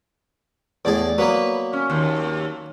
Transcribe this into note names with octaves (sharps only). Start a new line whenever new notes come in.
E2 A2 G#4 D5
F#3 A#3 B3 B4
C#4
D#2